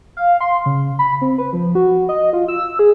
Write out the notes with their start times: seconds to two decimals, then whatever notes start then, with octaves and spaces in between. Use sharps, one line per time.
0.17 F5
0.41 C6
0.66 C#3
0.99 B5
1.21 C4
1.38 B4
1.53 F3
1.75 F#4
2.09 D#5
2.33 F4
2.48 E6
2.79 G#4